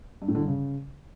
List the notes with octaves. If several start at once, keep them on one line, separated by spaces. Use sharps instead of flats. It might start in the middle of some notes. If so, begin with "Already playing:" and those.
G2
A2
D3
G2
C#3